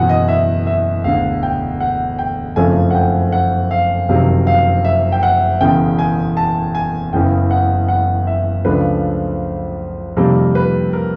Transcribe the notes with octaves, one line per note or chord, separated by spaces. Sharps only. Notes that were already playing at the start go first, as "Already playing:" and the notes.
Already playing: F#1 E2 B2 F#5 G#5
D#5
E5
E5
E1 D2 D3 F5
G5
F#5
G5
F#1 F2 C#3 F3 A3 G#5
F#5
G5
F#5
F5
F#1 F2 C3 D#3 F#3 F5
F5
E5
G5
F#5
E1 E2 C#3 G5
G#5
A5
G#5
F#1 E2 C#3 E3 G5
F#5
F#5
E5
C#2 C#3 F3 A3 D4 B4
F2 C3 D#3 G3 A#3 A#4
B4
A#4